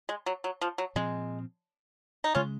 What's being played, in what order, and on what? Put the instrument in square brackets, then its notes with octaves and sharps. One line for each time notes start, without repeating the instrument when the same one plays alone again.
[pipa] G#3
F#3
F#3
F3
F#3
[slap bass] A#2 F3 C4 [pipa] G#3
[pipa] D#4
[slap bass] C#3 G#3 [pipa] C#4 F4